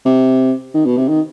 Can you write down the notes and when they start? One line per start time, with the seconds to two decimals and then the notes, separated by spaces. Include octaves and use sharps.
0.05 C3
0.74 D#3
0.86 B2
0.97 C3
1.08 D#3